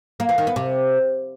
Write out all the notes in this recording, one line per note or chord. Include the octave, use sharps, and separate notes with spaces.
A#3
E3
D#3
B3
C3